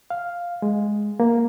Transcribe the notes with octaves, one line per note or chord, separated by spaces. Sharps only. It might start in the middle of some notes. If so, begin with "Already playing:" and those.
F5
G#3
A#3